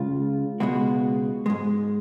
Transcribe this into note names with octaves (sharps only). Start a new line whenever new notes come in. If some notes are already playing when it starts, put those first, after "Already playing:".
Already playing: C#2 C#3 G#3 F4
C#2 B2 G#3 F#4
G#2 G#3